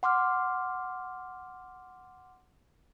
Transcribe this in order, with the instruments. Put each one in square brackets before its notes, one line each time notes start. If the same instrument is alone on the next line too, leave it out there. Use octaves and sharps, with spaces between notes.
[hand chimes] F#5 C6 D6 F6